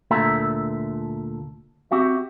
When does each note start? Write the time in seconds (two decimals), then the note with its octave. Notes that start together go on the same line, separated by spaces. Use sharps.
0.11 D2 A#2 A4 E5 A#5
1.91 C4 F#4 G4 E5